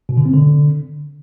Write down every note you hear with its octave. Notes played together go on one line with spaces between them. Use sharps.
B2
D3
C4
D3